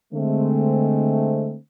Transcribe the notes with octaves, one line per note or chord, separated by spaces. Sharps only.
D3 G#3 A3 C4